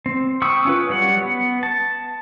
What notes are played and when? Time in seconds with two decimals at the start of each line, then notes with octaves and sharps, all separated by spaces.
0.06 C4
0.42 G5 B5 C#6 D#6 E6
0.65 C#4 F4 B4
0.89 F#3 G3 C#5 F#5
1.22 B3
1.63 A5